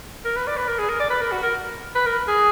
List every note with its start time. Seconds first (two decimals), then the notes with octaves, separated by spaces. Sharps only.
0.25 A#4
0.36 B4
0.47 D5
0.57 B4
0.68 A#4
0.79 G#4
0.89 A#4
1.00 D5
1.10 B4
1.21 A#4
1.31 F#4
1.42 A#4
1.95 B4
2.06 A#4
2.28 G#4